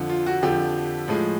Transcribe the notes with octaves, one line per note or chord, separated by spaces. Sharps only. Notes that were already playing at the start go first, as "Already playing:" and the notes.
Already playing: F2 D3 F3
F4
F#4
F2 D3 F3 G4
A2 F3 G#3